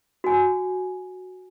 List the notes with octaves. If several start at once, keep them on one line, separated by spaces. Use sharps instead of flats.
F#4 G#5